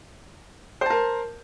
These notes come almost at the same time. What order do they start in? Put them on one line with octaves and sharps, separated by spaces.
C5 A5 A#4